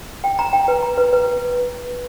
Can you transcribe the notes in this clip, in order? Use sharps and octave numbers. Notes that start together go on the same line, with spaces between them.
G5
A#5
G5
B4
A#5
B4
B4